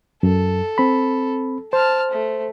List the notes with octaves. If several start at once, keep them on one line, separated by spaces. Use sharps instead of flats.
F#2 A4
C4 B5
C5 A5 F6
A3